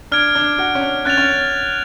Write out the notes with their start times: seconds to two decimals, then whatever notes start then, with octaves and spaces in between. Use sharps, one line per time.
0.12 D4 F6 G#6 D7
0.35 D4
0.58 F#4
0.75 C#4
0.81 D4
1.05 C#4 F#6 A6 F7
1.17 C#4